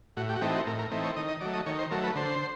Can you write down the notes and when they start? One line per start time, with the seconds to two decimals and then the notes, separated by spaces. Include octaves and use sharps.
0.17 A2 F#4
0.29 G4
0.36 F#4
0.41 E3 A3 C4 D#4 G4
0.54 F#4
0.67 A2 A#4
0.79 A#4
0.91 E3 A3 C4 D#4
1.04 C#5
1.16 D#3 D#5
1.28 D#5
1.41 F#3 A3 D5
1.53 D#5
1.66 D#3 C#5
1.79 C5
1.91 F#3 A3 A#4
2.03 B4
2.15 D3 C5